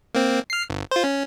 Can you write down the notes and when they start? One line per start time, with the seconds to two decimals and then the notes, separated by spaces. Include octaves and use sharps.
0.15 A#3 C4
0.50 F6 C7
0.70 G1
0.91 F4 C5
1.04 C#4